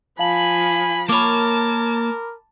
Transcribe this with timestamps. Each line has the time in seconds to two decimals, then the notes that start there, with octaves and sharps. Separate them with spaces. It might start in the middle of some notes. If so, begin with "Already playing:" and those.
0.19 F3 F5 G#5 A5 B5 F#7
1.09 A#3 A#4 C#5 A5 B5 D6